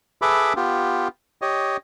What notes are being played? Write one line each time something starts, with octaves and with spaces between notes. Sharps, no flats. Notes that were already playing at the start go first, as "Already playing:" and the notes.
G#4 A4 B4 E5 B5 D6
B3 F4 G4
G4 C#5 D#5